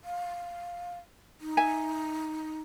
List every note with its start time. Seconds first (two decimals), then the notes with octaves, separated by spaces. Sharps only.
0.04 F5
1.41 D#4
1.57 E5 G#5